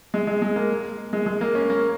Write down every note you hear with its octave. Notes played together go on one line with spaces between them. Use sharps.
G#3
G#3
G#3
A#3
G#3
G#3
A#3
C#4
A#3